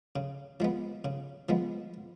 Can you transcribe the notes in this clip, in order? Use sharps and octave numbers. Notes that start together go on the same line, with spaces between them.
C#3
F3 G#3 B3
C#3
F3 G#3 B3